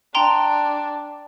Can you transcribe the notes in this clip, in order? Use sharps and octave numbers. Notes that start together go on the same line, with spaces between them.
D4 G5 A#5 C6